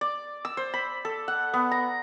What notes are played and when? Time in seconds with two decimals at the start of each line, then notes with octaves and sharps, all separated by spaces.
0.01 D5
0.45 E6
0.57 C5
0.74 B5
1.05 A4
1.28 F#5
1.54 B3
1.71 A#5